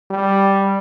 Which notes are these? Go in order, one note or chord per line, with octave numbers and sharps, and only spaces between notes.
G3